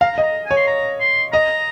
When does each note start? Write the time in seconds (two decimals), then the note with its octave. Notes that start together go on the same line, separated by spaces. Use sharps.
0.01 F5 A#5
0.18 D#5
0.23 A#5
0.46 C#5 G#5
0.57 C6
0.67 A#5
1.00 C6
1.33 D#5 A#5